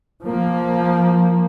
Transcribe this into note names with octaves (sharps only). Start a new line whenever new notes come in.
F3 A#3